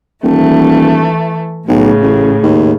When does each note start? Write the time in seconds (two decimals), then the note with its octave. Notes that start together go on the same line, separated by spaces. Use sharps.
0.24 D#1 E3 A3
1.68 B1 A2 C#3
2.02 A1
2.43 D#2